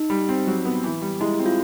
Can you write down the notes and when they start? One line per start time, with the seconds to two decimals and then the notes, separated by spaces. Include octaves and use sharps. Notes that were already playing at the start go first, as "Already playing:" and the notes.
Already playing: D#4
0.10 G3
0.29 C4
0.47 F#3
0.65 B3
0.84 E3
1.02 G3
1.21 G#3 E4
1.33 E4
1.39 C4
1.46 F4